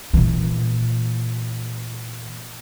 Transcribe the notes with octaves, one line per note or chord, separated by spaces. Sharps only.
A#2 E3